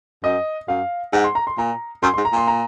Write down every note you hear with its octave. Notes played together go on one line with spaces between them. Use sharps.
F#2 D#5
F#2 F5
G#2 F#5
C6
A#5
C6
A#2 A#5
F#2 C6
C6
G#2
A#5
A#2 C6
A#5